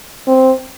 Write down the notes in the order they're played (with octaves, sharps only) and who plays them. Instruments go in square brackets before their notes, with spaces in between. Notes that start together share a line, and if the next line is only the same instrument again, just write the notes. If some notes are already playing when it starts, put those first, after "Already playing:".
[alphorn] C4